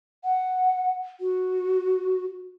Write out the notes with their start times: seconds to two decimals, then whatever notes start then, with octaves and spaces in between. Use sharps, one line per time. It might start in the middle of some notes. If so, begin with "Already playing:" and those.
0.24 F#5
1.21 F#4